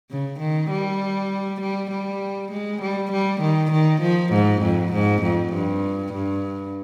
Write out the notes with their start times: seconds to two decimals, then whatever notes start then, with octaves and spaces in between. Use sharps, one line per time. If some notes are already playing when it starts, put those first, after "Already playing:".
0.11 C#3
0.40 D#3
0.71 G3
1.61 G3
1.91 G3
2.52 G#3
2.82 G3
3.12 G3
3.42 D#3
3.72 D#3
4.02 F3
4.33 G#2
4.62 F2
4.93 G#2
5.23 F2
5.54 G2
6.14 G2